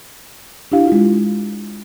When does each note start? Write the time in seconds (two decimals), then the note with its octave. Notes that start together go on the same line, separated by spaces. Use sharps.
0.72 D4 E4 G4 F5
0.87 G#3 F4